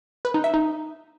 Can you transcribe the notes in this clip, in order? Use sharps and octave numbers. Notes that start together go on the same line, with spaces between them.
B4
D#4
E5
D#4